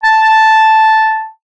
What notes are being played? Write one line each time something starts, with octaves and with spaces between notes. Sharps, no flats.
A5